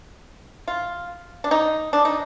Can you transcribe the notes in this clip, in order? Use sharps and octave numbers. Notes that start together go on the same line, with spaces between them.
F4
D4
D#4
D4
D#4